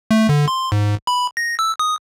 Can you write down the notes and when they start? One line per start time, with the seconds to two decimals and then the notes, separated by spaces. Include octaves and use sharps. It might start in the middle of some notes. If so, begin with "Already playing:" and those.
0.11 A3
0.29 D3
0.48 C6
0.72 G#2
1.07 B5
1.37 A#6
1.59 E6
1.79 D#6